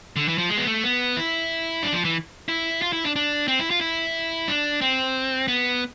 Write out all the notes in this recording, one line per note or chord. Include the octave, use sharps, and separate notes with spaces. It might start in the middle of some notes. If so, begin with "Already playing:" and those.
D3
E3
F3
G#3
B3
A3
B3
E4
D4
F3
E3
E4
F4
E4
D4
D4
C4
E4
F4
E4
D4
C4
B3